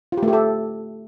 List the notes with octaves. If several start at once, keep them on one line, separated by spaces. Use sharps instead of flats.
F4
G4
A3
G4
A4